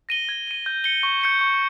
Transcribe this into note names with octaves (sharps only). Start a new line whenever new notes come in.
A#6 D#7 G7
G#6
D#7 G7
G6
C#7 G7
C#6
G6 C#7 G7
C#6